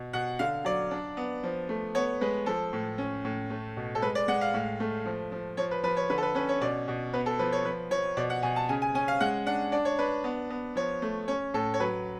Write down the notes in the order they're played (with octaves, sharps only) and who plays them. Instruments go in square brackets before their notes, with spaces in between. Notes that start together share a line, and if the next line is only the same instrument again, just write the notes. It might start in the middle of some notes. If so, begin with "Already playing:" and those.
Already playing: [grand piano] B2
B2 F#5
D3 F5
F#3 D5
D4
B3
F3
A3
B3 C#5
G#3 B4
F3 A4
A2
C#4
A2
A3
B2
A4
G#3 B4
D5
G#3 F#5
F5
A2
A3
F3
F3
F3 C#5
B4
F3 B4
C#5
D3 B4
A4
B4
C#4 B4
C#5
B2 D5
B2
B3 B4
A4
F3 B4
C#5
F3 B4
F3 C#5
B2 D5
F#5
B2 G#5
A5
C#3 G#5
G#5
C#4 G#5
F5
G#3 F#5
D4 F#5
D4 D5
C#5
D4 B4
B3
B3
F3 C#5
A3
C#4 C#5
A2 A4
C#5
F#3 B4